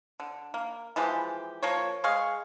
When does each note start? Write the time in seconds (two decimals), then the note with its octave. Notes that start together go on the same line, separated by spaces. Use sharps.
0.20 D3
0.54 A#3
0.96 E3 F3 G#3 G4
1.63 F3 A#3 C#5
2.04 G#3 G#4 F5 C#6